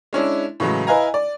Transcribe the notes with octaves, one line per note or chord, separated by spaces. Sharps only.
G#3 C#4 D4 E4
A2 C#3 E3 F#3 G#3
E4 B4 D#5 F5 G#5 A#5
D5